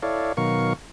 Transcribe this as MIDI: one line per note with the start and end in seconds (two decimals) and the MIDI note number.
0.03 0.33 64
0.03 0.33 69
0.03 0.33 73
0.03 0.33 74
0.03 0.33 77
0.37 0.73 47
0.37 0.73 51
0.37 0.73 54
0.37 0.73 70
0.37 0.73 77
0.37 0.73 85